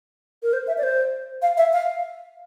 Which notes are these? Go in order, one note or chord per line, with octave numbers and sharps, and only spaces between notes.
A#4
C5
E5
D5
C5
F5
E5
F5